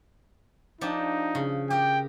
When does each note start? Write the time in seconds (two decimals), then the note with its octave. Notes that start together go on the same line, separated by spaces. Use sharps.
0.81 F3 D4 D#4 G4
1.35 C#3
1.70 G4 A#4 G5